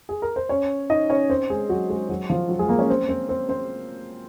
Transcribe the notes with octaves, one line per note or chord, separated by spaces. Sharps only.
G#4
A#4
C5
C#4 C#5
D#4 D#5
C#4 C#5
C4 C5
G#3 G#4
F#3 F#4
G#3 G#4
F#3 F#4
F3 F4
F#3 F#4
G#3 G#4
A#3 A#4
C#4 C#5
C4 C5
C4 C5
C4 C5
C4 C5